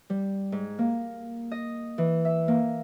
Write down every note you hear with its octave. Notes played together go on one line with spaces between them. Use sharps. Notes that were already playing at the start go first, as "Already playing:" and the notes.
G3
G#2
A#3
D#5
E3
E5
A#3